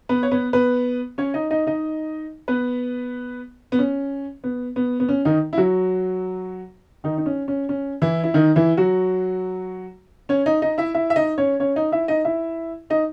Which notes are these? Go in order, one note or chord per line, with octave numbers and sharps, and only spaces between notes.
B3 B4
C#5
B3 B4
B3 B4
C#4 C#5
D#4 D#5
D#4 D#5
D#4 D#5
B3 B4
B3
C#4
B3
B3
B3
C#4
D#3 D#4
E4
F#3 F#4
D#3 D#4
D#4
C#4
C#4
C#4
E3 E4
E4
D#3 D#4
E3 E4
F#3 F#4
C#4 C#5
D#4 D#5
D#4 D#5
E4 E5
E4 E5
E5
D#4 D#5
C#4 C#5
C#4 C#5
D#4 D#5
E4 E5
D#4 D#5
E4 E5
D#4 D#5